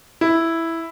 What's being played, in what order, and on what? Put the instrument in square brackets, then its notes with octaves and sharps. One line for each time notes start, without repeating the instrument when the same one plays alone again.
[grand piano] E4